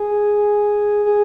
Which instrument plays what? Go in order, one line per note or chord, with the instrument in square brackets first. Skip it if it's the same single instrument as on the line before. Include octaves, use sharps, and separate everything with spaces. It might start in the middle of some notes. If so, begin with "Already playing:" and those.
Already playing: [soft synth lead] G#4
G#4